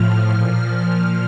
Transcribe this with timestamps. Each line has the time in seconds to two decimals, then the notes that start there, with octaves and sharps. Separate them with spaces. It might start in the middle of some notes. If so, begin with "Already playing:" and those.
Already playing: A2 F3 F6
0.33 A#2 F3 F6
0.68 F6